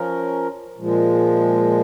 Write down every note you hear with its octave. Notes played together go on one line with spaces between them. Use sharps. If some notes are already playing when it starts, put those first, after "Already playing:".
Already playing: F3 C#4 A#4
A#2 F3 G#3